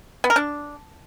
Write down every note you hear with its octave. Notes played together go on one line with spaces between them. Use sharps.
B3
A#4
D4